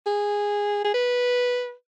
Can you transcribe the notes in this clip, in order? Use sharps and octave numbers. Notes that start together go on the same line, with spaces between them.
G#4
G#4
B4